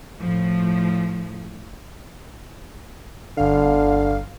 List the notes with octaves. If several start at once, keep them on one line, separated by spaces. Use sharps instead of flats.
A2 F3
G1 D3 F5